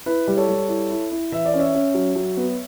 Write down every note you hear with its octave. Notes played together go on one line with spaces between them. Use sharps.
E4 B4
G3
A4 C#5
G3
E4
E4
E4
E3 E5
D5
C#4
C#5 E5
C#4
F#3
F#3
B3